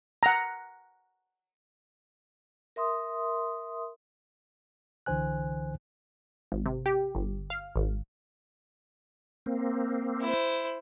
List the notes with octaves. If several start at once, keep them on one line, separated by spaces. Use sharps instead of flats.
F#5 A#5
A#4 E5 C6 D#6
C2 D3 E3 C5 G#5 F#6
G#1
C3
G4
G1
F5
G#1
A#3 C4
E4 C5